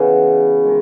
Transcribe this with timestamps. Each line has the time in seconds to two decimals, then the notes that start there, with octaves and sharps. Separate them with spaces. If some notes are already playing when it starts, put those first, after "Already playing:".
Already playing: C#3 E3 B3 F#4
0.64 D#3 G#3